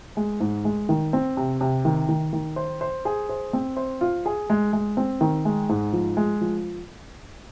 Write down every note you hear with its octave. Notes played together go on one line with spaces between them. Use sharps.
G#3
G#2
G#3
D#3
C4
C3
C3
D#3
D#3
D#3
C5
C5
G#4
C5
C4
C5
F4
G#4
G#3
G#3
C4
D#3
G#3
G#2
F3
G#3
F3